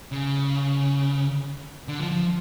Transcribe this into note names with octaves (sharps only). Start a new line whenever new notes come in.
C#3
D3
F3
F3